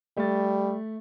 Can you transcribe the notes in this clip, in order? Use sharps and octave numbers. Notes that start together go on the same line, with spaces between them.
G3 A3 A6